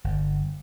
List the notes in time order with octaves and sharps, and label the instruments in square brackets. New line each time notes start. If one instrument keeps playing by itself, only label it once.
[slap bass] G1